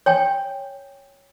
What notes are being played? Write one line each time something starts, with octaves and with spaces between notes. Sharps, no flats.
C#5 G5 G#5